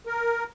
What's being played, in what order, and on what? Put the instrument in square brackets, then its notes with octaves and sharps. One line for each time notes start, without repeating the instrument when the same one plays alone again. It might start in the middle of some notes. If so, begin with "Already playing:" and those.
[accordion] A#4